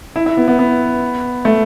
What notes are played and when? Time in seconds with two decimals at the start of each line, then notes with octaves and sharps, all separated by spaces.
0.16 E4
0.26 E4
0.37 B3
0.48 B3
0.59 B3
1.45 A3